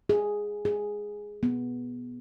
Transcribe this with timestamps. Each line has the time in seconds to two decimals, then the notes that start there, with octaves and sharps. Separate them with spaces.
0.09 G#4
0.65 G#4
1.43 B3